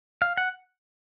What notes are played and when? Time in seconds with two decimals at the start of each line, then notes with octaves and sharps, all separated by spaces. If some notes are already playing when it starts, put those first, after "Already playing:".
0.22 F5
0.37 F#5